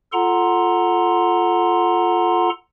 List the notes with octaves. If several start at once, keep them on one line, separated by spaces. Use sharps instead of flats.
F4 A4 F#5 A#5 C6